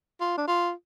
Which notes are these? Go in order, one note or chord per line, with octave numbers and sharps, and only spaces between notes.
F4
D4
F4